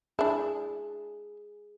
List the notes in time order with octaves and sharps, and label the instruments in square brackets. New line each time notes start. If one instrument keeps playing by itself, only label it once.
[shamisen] D4 E4 [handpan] G#4